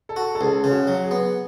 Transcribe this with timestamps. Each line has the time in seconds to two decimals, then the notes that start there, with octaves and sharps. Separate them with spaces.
0.09 A4
0.16 F#4
0.35 A4
0.41 C#2 G#4
0.64 C#3
0.71 F#4
0.87 F#3
1.03 G#4
1.11 B3